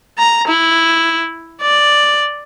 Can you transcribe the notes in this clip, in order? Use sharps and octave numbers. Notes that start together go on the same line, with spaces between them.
A#5
E4
D5